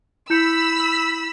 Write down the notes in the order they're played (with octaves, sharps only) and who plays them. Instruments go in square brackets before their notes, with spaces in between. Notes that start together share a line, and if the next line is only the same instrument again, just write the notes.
[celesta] E4 G6 C#7 [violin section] B5 E6 B6